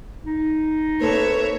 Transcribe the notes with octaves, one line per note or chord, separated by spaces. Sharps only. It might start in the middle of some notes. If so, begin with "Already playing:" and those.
D#4
A#3 C4 A4 B4 C#5 E5